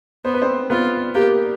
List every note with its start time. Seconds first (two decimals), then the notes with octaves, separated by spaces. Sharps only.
0.25 B3 C5
0.34 B4
0.42 C4 C5
0.70 B3 F4 B4
1.15 A#3 G4 A#4